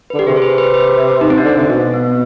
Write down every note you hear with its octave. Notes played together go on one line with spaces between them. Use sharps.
D3 B4
G4
C3 G#4
C5
B4
B4
B4
D#4
C4
D4
D3
C3 C4
B2 C4
B3